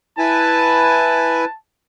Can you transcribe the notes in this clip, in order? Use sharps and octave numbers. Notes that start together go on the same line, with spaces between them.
E4 B4 G#5 A5